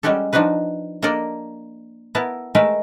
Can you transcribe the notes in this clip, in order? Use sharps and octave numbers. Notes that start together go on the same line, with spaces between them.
G3 G#3 C#4 F#4 G4 A4
F3 D4 D#4 F#4 B4
A#3 D4 A4 A#4 D5 D#5
B3 E4 A#4 A5
G#3 A3 A#4 B4 E5